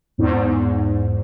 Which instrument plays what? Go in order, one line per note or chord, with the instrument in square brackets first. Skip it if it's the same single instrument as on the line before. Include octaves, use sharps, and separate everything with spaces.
[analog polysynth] E2 G#2